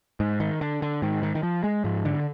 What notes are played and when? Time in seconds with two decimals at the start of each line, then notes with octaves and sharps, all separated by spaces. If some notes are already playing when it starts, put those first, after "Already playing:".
0.20 G#2
0.40 D#3
0.61 D3
0.82 D3
1.02 G#2 D#3
1.23 D#3
1.35 D#3
1.43 F3
1.64 G#3
1.84 G#2 F3
2.05 D3